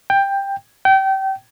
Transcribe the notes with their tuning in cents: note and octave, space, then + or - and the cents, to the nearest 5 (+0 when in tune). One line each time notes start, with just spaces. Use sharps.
G5 +10
G5 -30